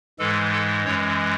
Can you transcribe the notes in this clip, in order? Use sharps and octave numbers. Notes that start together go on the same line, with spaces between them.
G#2 E3 G#3 A4
A4
F#2 E3 G#3 C#5